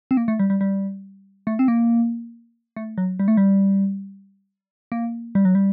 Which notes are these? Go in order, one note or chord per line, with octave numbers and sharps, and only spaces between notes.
C4
A#3
A3
G3
G3
G3
A3
C4
A#3
A3
F#3
G3
A3
G3
A#3
G3
F#3
G3